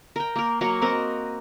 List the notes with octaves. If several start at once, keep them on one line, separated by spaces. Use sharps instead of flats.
A#4 G5
A#3 A#4
F#3 A#3 A#4 C#6
C4 F#4 A#4 D#5